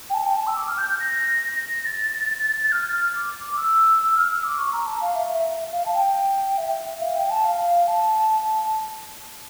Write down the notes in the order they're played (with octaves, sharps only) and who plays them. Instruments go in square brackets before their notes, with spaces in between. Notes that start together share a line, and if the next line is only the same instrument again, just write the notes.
[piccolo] G5
A5
G5
A5
E6
D6
F6
G6
G6
A#6
A6
F6
F6
D6
D6
E6
F6
E6
D6
C#6
A#5
A5
F5
E5
E5
F5
A5
G5
E5
F5
G5
A5
F5
A5